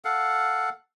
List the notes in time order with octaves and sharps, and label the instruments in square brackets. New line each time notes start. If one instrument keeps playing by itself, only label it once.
[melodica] A4 F5 F#5